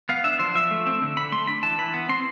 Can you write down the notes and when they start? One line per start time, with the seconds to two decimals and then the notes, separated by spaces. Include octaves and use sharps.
0.09 B3 F5
0.24 D4 E5
0.39 F3 C5
0.55 F3 E5
0.71 A3
0.86 C4
1.02 D3
1.17 D3 B5
1.32 A3 C6
1.47 D4 B5
1.63 E3 A5
1.78 E3 B5
1.94 B3
2.09 C4 C6